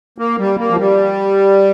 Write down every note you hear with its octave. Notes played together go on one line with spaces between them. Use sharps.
A#3
G3
A#3
F3
G3